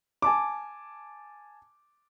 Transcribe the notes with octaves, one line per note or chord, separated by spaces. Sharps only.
G#5 A5 D6